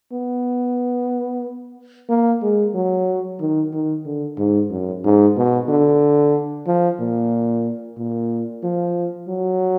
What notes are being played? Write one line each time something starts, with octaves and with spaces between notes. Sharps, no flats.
B3
A#3
G#3
F#3
D#3
D#3
D3
G#2
F#2
G#2
B2
D3
F3
A#2
A#2
F3
F#3